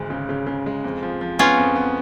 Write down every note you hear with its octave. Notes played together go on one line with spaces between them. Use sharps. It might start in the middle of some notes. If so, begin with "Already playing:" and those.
Already playing: G#1 D2 G#3
C#3
C#3
C#3
G#3
F2
F3
F3
B3 C#4 F4
F2
B3